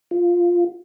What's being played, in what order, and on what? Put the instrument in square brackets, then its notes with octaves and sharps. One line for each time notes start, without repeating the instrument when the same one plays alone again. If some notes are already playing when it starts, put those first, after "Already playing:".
[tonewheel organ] F4